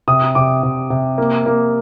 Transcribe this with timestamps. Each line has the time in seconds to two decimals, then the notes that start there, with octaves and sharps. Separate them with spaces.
0.08 C3 D#6
0.35 C3 D6
0.63 C3
0.90 C3
1.18 A#3
1.46 A#3